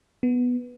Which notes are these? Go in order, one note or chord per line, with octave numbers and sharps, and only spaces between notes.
B3